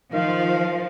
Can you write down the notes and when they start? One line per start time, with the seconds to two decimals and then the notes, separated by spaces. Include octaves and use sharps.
0.13 D#3 F3 F5